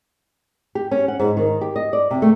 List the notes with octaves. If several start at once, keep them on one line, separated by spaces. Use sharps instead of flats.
G4
C#4
F#5
G#2
D#3
G4
D#5
D5
C3
A3